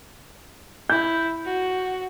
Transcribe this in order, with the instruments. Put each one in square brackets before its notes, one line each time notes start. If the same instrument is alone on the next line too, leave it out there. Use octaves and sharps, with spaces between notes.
[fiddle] E4 [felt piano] G6
[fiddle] F#4